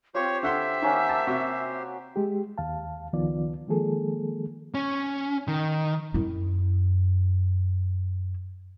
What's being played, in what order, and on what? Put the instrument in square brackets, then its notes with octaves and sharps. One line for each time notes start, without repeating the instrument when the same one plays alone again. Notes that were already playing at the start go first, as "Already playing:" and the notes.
[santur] C4 F4 [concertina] G4 C5 [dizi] C#5
[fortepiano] D3 F#5 C6 [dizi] E5
[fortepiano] D#3 [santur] A#3 C#4 F#5
[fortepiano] A5
[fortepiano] C3 [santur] F#4
[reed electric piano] G#3 G4
D#2 F5 A5
C#2 D#3 F3 B3 F4 D5
D#3 F3 G#3 A#3 G#4 A4
[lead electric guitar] C#4
D#3
[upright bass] F#2 E4